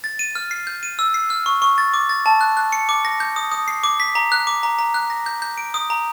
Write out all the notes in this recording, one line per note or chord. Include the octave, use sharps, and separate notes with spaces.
A6
D#7
F6
C7
G6
D#7
E6
C7
F6
C#6
C#6
A6
D6
A6
A5
F#6
F#6
C#7
D6
A#6
G6
D#6
D#6
C7
D6
B6
A#5
F#6
D6
A#5
A#5
F#6
A#6
G6
G6
D7
D#6
A#5